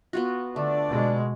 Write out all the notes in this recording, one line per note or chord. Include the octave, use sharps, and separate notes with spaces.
B3 F4 F#4
D3 A3 D4 D5
B2 G#3